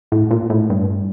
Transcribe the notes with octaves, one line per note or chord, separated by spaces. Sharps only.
A2
A#2
A2
G2